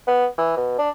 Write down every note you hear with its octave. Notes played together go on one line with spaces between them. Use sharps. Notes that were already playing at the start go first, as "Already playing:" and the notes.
B3
E3
B2
D4